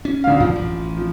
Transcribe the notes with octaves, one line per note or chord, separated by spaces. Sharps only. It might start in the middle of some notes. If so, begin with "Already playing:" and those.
C#4
D2 F5
F#2 F3
A1
F3